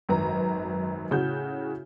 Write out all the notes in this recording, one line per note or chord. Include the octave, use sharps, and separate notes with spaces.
G#1 F#2 B4 A#5
A2 C#3 F#4 G6